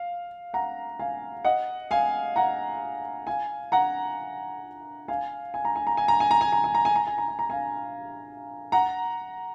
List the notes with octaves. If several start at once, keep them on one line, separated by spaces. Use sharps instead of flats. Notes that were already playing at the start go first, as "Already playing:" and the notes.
Already playing: F5
F#5 A#5
F5 G#5
D#5 F#5
F5 G#5
F#5 A#5
F5 G#5
F#5 A#5
F5 G#5
G#5
A#5
G#5
A#5
G#5
A#5
G#5
A#5
G#5
A#5
G#5
A#5
G#5
A#5
G#5
A#5
G#5
A#5
F5 G#5
F#5 A#5